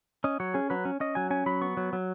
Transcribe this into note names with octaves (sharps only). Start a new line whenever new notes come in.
C#4 D#5
F#3 C#5
C#4 G#4
F#3 B4
C#4
C#4 D#5
F#3 G#5
C#4 G#5
F#3 B5
B3 C#6
F#3
F#3